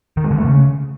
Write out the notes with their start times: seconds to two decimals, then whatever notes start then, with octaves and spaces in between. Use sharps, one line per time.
0.17 D#3
0.24 G#3
0.31 D3
0.38 A3
0.45 C#3